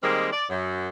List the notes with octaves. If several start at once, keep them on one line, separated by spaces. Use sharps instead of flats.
D#3 G3 G#3 A#3 C4
D5
F#2